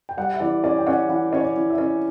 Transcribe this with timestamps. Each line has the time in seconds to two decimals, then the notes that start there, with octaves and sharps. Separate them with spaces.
0.09 G5
0.17 G3 F#5
0.34 E5
0.40 E3 D5
0.64 C#4 D5
0.78 G5
0.87 C#4 F#5
1.09 E3 F#5
1.33 C#4 C#5
1.40 D5
1.56 E3
1.70 E5
1.78 C#4